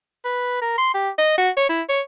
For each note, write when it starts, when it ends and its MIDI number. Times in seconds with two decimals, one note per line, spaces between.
0.25 0.58 71
0.62 0.74 70
0.78 0.91 84
0.94 1.10 67
1.18 1.34 75
1.38 1.50 66
1.57 1.66 73
1.69 1.82 64
1.89 2.01 73